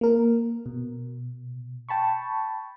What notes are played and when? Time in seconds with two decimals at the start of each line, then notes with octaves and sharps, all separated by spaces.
0.01 A#3 A#4
0.66 B2
1.89 G5 A5 B5 C#6